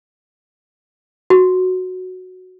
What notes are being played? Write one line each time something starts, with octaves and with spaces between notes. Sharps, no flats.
F#4